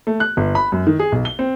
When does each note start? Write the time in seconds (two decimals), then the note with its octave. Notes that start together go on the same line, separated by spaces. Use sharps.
0.07 A3
0.20 F#6
0.37 G1
0.55 B5
0.72 F#2
0.87 D#3
0.99 G#4
1.12 B1
1.25 G7
1.39 C4